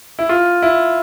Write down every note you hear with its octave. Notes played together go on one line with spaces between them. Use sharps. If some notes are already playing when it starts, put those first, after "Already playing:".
E4
F4
E4